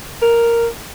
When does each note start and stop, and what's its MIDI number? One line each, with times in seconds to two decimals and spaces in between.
0.22 0.68 70